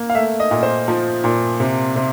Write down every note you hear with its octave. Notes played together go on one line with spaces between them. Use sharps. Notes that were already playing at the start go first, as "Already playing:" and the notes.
Already playing: A#3
F5
A3 E5
D#5
A#2
C5
F3
A#2
C3
C3